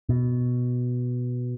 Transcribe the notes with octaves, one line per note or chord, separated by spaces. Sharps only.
B2